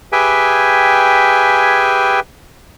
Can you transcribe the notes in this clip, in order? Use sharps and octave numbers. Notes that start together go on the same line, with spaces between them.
G4 G#4 B4 E5 G5 G#5